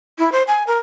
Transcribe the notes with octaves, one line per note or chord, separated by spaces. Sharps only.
E4
C5
G#5
A#4